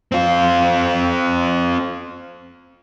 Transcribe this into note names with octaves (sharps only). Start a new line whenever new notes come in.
C4 F4